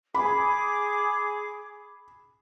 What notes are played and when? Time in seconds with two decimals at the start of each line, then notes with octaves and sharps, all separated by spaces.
0.15 G#4 B5 D6